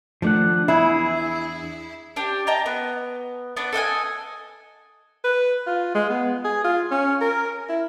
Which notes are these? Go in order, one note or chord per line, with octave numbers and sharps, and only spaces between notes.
D#3 F3 A3 D4 F#5
E2 D4 E4 G#4 E5
D4 G4
D#5 G5 A5 A#5
B3
B3 D4
A4 D#5 F#5 G#5
B4
F4
G#3
B3
G#4
F4
C#4
A#4
E4